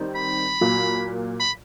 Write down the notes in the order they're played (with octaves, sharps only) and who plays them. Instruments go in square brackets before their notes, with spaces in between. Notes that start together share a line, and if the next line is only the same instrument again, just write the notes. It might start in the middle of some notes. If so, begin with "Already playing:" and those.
Already playing: [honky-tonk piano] D#3 G3 C4 D#4
[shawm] B5
[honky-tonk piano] A#2 F#3 A#3
[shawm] B5